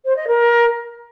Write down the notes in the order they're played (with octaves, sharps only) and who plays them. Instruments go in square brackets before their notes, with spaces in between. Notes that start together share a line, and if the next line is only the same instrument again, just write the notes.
[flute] C5
D#5
A#4